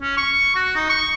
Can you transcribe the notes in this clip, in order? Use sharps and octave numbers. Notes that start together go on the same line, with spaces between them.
C#4
C#6
F#4
D#4
C#6